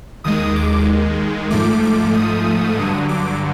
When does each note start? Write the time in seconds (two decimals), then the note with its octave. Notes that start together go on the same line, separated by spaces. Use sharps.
0.24 D#2 D#3 G#3 D#6
0.56 D6
1.50 G#2 F3 A3 D6
1.82 D6
2.14 D#6
2.77 G2 D3 F#3
3.09 D6